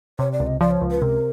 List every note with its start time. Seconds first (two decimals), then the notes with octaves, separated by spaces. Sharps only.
0.19 C3 C#5
0.32 D5
0.40 C#2
0.47 D#5
0.60 F3 D5
0.71 C#5
0.81 C#2
0.91 B4
1.02 C3 A#4